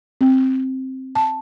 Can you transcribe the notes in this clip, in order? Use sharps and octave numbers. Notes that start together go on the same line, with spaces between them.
C4
A5